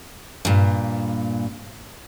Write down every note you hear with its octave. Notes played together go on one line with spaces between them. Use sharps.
G2 A#2